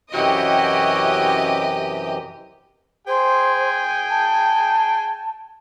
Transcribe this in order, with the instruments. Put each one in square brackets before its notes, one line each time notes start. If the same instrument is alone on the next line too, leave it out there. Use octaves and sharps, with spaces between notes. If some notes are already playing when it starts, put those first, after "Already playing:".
[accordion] F#2 C3 E3 [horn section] C#4 E4 F#4 [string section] G4 D#5
[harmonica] G#4 G5 G#5 [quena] C5
[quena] A5